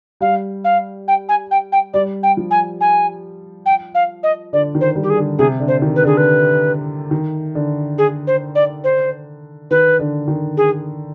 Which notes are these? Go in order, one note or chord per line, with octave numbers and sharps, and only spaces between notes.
G3 F5
F5
G5
G#5
G5
G5
G3 D5
G5
F3
G#5
G#5
G5
F5
D#5
D3 D5
D#3
C5
G3
G4
G#4
D3
C3 G#4
D3
C5
D#3
B4
D3 G#4
B4
D#3
D3
G#4
C5
D5
C5
D#3 B4
D3
D#3
G#4